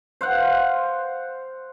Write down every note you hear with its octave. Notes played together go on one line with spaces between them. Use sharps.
C5 F5 F#5